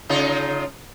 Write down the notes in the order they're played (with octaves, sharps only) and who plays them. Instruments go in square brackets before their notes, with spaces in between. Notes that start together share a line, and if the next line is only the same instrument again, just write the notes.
[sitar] C#3 D#4 F4